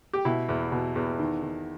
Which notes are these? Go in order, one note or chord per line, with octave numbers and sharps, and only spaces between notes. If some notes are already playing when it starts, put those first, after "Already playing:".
G4
B2 E4
E2
B2
E2
D#3
D#3